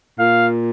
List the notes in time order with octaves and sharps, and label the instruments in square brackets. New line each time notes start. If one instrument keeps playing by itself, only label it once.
[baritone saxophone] A#2 [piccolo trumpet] F5